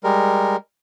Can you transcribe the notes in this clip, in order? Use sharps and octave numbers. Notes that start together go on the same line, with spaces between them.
G3 G#3 A#4